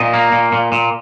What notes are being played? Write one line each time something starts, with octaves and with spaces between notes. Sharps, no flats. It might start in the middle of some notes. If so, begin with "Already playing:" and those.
Already playing: A#2 D#5
A#3
A#2
A#2
A#2